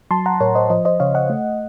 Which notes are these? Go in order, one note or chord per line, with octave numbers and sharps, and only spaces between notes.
F#3 A5 C6
F#5 A#5
A2 A#4 C#5
C5 D#5
F3 C5 D#5
C5 D#5
C#3 C#5 F5
D#5 F#5
A3